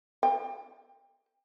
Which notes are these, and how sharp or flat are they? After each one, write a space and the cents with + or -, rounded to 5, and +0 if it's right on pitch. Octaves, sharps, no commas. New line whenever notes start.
G5 +30